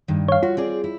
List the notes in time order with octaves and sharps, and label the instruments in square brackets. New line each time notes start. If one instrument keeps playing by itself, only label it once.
[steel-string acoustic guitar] G2 D#3
[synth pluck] C#5 F5
[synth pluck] F4 [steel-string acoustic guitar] F#4
[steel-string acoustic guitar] C4 G#4 D5
E4